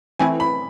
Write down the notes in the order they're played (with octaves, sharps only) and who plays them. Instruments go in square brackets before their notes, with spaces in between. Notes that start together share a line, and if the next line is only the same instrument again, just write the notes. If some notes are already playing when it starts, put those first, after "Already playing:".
[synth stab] E3 A3 C4 E4 [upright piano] G#5
[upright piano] B5